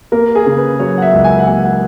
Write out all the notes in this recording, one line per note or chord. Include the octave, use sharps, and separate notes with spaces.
A#3 A#4
G#4
C#3
B4
F#3 C#5
F#5
E5
C#2
G#5
F#5
A#3 G#5
F#5